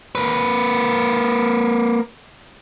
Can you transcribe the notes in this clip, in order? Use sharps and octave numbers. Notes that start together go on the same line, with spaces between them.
A#3 B4